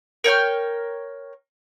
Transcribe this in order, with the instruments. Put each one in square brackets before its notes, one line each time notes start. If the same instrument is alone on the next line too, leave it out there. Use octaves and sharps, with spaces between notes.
[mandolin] A#4 C#5 G5 F6